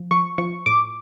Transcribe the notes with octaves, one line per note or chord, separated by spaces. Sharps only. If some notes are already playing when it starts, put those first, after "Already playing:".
Already playing: F3
F3 C#6
F3 C#6
A2 D6